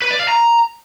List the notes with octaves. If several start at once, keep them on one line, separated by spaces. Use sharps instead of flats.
B4
D5
F5
A#5